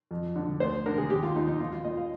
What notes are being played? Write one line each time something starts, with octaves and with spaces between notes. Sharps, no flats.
F2
D3
D2 C5
D3 A#4
G#4
D#2 G4
F4
D#2 D#4
D#4
A#2 F4
F4
A#2 D#5
F5